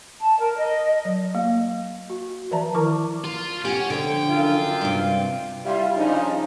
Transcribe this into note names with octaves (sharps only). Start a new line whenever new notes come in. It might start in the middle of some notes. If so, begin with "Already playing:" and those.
A5
A#4
D#5
F#3
A#3
F#4
E3 F3 D5 E5 A5 A#5
D#3 E4 A#4 A5 C#6 D6
F4
C#4 G4 F#5
D3 F3 G5
F#2 F4
G2 C3
G3 E4 F4
C#3 F3 D4 D#4